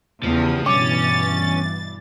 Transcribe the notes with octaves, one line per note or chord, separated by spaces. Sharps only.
E2 C#3 F3 G4 D#6
G2 B2 E3 C#4 D6 A6